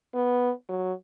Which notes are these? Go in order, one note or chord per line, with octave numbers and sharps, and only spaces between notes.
B3
F#3